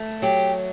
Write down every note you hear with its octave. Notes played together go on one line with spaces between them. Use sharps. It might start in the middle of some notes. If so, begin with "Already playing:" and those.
Already playing: A3
F#3 G4